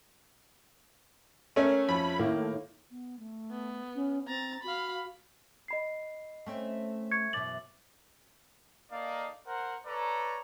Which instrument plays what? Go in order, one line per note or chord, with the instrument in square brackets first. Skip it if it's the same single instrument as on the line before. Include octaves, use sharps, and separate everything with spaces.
[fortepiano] A3 C#4 [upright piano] A#4 C#5
[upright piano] F2 F3 [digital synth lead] B5
[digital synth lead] A2 [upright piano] D#3 A#3
[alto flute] B3
A3
[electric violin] B3
[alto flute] C#4
[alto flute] C4 [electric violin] A#5 A6
[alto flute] F#4 [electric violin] F5 B5
[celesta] D#5 B5 C7
[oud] A3 C4 C#4
[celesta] C#6 G#6 C#7
[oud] F#2 B2 E3 [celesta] D6 A6 F#7
[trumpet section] A#3 D#4 A4 D5 D#5 F5
A#4 C5 F#5
A4 B4 C#5 D5 A#5